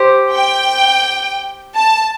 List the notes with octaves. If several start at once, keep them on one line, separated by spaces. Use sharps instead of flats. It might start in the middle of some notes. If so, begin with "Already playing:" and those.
Already playing: G4 C5
G5
A5